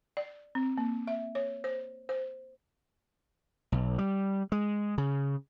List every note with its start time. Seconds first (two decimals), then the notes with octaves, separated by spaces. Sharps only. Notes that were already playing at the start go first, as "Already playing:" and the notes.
0.17 D5
0.55 C4
0.78 A#3
1.07 E5
1.35 C#5
1.64 C5
2.09 C5
3.72 B1
3.98 G3
4.52 G#3
4.98 C#3